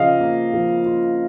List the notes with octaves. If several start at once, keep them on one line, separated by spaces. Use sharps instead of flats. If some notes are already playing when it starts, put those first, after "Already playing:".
Already playing: C#3 F3 F4 D#5 F5
A#3
F3
F4